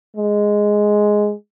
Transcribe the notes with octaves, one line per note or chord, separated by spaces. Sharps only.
G#3